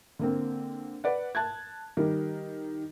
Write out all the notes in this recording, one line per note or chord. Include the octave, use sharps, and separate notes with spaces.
D3 A#3 C4
B4 D5 F#5
A5 F#6 G#6
D#3 G3 A#4